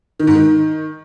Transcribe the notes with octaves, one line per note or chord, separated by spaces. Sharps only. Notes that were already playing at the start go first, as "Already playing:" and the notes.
D#3
G#2
D#3